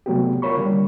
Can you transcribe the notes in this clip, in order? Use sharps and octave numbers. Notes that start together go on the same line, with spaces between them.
C3 F#3 A3 B3 F#4 G4
F4 A#4 C#5 B5 C#6
D3 G3 A#3